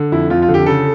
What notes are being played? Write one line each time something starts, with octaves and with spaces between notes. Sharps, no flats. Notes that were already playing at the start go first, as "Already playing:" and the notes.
Already playing: D3
F2 E4
F2 F4
F4
D3
G4
C#3 A4